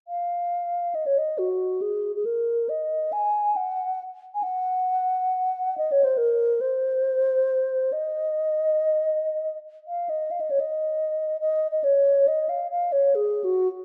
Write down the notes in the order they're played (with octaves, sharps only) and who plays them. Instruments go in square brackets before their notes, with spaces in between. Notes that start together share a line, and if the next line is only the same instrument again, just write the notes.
[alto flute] F5
D#5
C#5
D#5
F#4
G#4
G#4
A#4
D#5
G#5
F#5
G#5
F#5
D#5
C#5
C5
A#4
C5
D#5
F5
D#5
F5
D#5
C#5
D#5
D#5
D#5
C#5
D#5
F5
F5
C#5
G#4
F#4